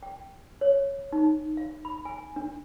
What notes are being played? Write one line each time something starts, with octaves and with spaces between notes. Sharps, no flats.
G5
C#5
D#4
F5
B5
G#5
D4